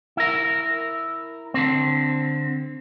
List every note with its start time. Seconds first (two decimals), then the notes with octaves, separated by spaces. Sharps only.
0.17 E4 A#4
1.54 D3 C4